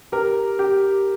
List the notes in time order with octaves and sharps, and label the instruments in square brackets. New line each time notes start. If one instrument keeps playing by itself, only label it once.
[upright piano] G4 [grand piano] A#4
[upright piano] G4